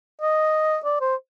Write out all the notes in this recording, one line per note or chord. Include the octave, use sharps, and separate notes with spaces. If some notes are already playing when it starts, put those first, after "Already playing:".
D#5
D5
C5